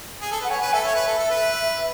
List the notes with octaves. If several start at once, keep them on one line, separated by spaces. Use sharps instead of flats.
G#4
A4
B4 F#5
C#5 G#5
B4
A4 E5
C#5
B4
A4
A4
B4